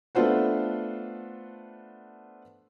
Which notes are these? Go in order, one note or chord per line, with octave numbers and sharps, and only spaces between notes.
A3 B3 D4 F4 C5 F#5